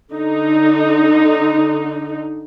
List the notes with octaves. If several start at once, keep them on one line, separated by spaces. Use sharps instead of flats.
D3 D#4